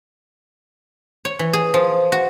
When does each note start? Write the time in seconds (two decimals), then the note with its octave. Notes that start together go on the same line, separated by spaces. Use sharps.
1.25 C#5
1.39 E3
1.53 G#4
1.74 F3
2.12 F#4